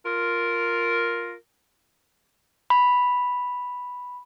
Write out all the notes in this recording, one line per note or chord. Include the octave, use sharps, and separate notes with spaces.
F4 A#4
B5